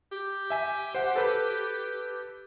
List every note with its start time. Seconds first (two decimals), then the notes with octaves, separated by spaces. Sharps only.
0.12 G4
0.50 E5 G#5 B6
0.95 C5 F#5
1.16 A4 B4